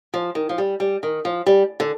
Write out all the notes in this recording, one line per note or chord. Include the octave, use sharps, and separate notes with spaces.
F3
D#3
F3
G3
G3
D#3
F3
G3
D3